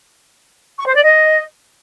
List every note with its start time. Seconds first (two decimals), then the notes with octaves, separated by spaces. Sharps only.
0.79 C#6
0.87 C5
0.95 D5
1.03 D#5